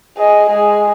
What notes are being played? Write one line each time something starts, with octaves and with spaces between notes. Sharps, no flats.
G#4 D#5
G#3 G#4